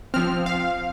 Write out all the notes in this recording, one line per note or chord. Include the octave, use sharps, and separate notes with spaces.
F3 C4 F6
F5